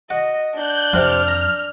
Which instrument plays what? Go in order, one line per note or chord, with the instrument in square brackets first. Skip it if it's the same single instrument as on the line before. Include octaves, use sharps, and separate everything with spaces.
[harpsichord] F#4 [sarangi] D#5
[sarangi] D4 [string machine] F#6 G6
[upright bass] F2 [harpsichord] C3 C4 F4 [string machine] F6
[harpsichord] A#5